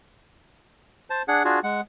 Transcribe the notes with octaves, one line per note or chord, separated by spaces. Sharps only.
C5 A5
D4 G#4 F#5
D4 F4 F#4 G#4
G#3 F#5